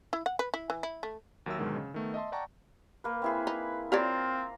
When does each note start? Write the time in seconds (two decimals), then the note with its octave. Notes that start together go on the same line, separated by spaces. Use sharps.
0.13 E4
0.26 F#5
0.39 B4
0.54 E4
0.70 E3
0.83 E4
1.03 A3
1.46 D#2 F#3 A#4 E5 E6
1.59 G#2 B2 D3 D#3 F#3 G#3
1.76 C#3
1.94 D#3 A3 B3
2.14 D#5 E5 A5 C6
2.32 D5 F#5 G5 A5 A#5 C#6
3.04 A#3 B4
3.22 C4 E4 G#4 B4
3.47 D#4
3.92 C4 F4 G4 C#5 D5 A#5